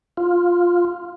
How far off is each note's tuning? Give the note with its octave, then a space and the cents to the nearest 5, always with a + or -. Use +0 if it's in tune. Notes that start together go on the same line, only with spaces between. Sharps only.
F4 +5